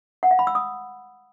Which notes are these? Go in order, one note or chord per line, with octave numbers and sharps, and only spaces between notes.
F#5
F5
B5
E6
D#6